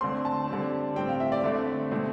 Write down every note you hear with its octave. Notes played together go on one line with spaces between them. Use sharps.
D3 A3 C4 C6
A5
D3 G3 C4
A2 G3 C4 G5
F5
E5
D5
D3 A3 C4 E5
B2 A3 C4